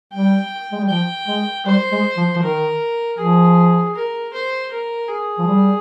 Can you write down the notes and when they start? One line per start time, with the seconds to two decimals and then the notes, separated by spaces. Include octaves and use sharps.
0.13 G3 G5
0.72 G#3
0.81 G3
0.89 F3 G5
1.28 G#3
1.66 G3 C5
1.92 G#3
2.17 F3
2.36 F3
2.42 D#3 A#4
3.18 F3 G#4
3.95 A#4
4.33 C5
4.72 A#4
5.09 G#4
5.39 F3
5.47 G3